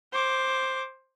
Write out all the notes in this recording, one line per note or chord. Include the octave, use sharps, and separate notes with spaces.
C5 D6